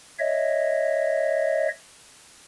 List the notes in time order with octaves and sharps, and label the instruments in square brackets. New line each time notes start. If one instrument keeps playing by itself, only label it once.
[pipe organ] C#5 D#5 E5